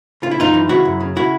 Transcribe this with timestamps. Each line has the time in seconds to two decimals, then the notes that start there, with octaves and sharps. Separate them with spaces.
0.22 C#3 F4
0.31 E4
0.38 F#2 D#4 F4
0.54 E3
0.69 C#3 E4 F#4
0.85 F#2
1.01 C#3
1.16 C#3 E4 F#4